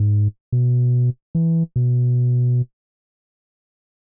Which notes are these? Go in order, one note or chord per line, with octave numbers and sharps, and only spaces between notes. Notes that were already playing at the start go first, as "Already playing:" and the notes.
Already playing: G#2
B2
E3
B2